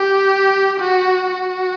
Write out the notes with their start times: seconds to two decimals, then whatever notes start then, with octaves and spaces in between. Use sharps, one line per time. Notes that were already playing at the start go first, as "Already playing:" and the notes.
Already playing: G4
0.80 F#4
1.30 F#4